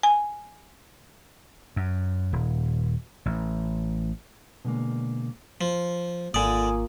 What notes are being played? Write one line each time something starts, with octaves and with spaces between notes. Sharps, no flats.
G#5
F#2
D#1
A1
B2 D3 G#3 A#3
F3
G#1 D3 A#3 F4 D5 G#5 D#6